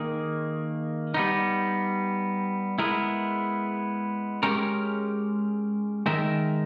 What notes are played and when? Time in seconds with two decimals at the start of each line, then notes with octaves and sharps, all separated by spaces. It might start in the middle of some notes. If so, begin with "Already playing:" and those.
Already playing: D#3 A#3 D#4 G#4
1.14 G3 B3 D#4
2.78 G#3 B3 E4 A#4
4.43 G#3 C#4 G4 A#4 C#5
6.06 D#3 G#3 D#4 A#4 E5